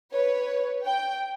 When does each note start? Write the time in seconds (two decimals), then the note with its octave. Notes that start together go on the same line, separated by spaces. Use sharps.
0.13 B4 C#5
0.85 G5